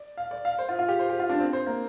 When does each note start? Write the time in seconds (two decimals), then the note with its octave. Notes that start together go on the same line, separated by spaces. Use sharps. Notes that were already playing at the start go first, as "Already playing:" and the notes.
Already playing: D5
0.17 F5
0.31 D5
0.45 F5
0.59 C5
0.69 F4
0.79 F4
0.88 G4
0.99 C5
1.09 G4
1.20 F4
1.29 D4
1.40 C4
1.53 C5
1.67 A#3